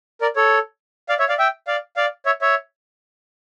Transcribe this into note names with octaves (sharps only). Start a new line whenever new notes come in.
A#4 D5
A4 C#5
D5 F5
C#5 E5
D5 F5
E5 G5
D5 F5
D5 F5
C#5 E5
C#5 E5